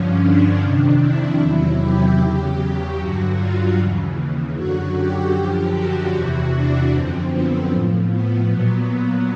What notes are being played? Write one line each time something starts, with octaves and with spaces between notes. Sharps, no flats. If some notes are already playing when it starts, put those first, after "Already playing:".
Already playing: G2 D3 F3 C#4
D4
F2 C3 D#3 D4
E4
E2 C3 D#3 F#3
G4
E2 C#3 F#3
G2 D3 F#3 F#4
F4
D#2 C#3 E3
F#2 D3 F#3 F#4
G4
F#2 D3 F3
F#4
E2 C3 E3 F#4
D4
F#2 D3 F3 C4
B3
A2 F3
B3
A#2 F#3 B3
B3